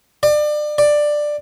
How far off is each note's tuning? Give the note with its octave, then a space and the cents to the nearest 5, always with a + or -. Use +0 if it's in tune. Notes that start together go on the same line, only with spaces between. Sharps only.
D5 +30
D5 +10